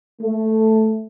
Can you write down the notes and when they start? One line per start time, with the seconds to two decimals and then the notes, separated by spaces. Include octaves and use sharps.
0.22 A3